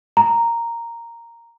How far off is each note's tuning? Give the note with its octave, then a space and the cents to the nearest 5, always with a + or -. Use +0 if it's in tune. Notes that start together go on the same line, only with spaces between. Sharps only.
A#5 -5